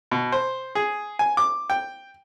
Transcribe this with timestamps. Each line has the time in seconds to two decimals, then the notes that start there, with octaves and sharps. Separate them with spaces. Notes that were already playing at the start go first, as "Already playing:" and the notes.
0.11 B2
0.32 C5
0.75 G#4
1.19 G#5
1.37 D6
1.70 G5